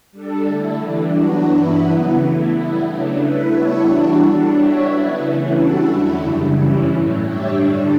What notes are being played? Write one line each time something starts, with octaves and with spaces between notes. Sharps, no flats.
G3 D4 A4
D3 A3 E4
E3 G3 D4
F#3 B3 D4 F#4
G2 E3 B3 E4 B4
C#3 F#3 B3
E3 A3 E4
G3 B3 E4
C#3 F#3 A3 D4
A3 E4 B4
G3 B3 E4 A4 C#5
E3 G3 D4 F#4
G3 D4 A4
G3 D4 F#4 C#5 E5
C#3 F#3 B3 E4 B4
E3 A3 C#4 E4
G3 D4 F#4 A4
E2 D3 F#3 A3 E4
F#2 C#3 G3
G2 E3 G3 C#4 E4
A2 F#3 A3
G3 D4 G4 C#5 E5
G2 D3 G3 D4